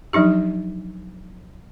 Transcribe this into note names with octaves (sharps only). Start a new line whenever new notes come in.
F3 F#3 D4 D#4 G4